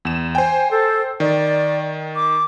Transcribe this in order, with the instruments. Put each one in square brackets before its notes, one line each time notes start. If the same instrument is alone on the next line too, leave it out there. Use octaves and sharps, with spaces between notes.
[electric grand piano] E2 E7
[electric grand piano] C5 G5 [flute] G#5
[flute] A4
[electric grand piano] D#3 [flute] D5
[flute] D6